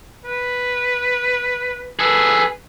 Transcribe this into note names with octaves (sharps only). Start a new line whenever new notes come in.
B4
G#4 A4 B4